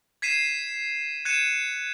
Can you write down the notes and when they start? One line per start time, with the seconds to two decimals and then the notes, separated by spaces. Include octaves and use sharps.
0.22 G#6 B6 C7 D#7 E7
1.25 F#6 G#6 C#7 D#7 E7